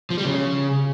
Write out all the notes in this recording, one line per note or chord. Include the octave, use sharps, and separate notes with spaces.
F3
G3
C#3